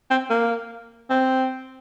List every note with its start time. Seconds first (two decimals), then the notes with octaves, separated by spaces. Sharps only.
0.11 C4
0.30 A#3
1.10 C4